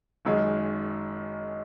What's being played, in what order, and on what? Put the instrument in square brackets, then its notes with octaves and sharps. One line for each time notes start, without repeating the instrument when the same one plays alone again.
[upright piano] F#1 F#2 D#3 G#3 D#4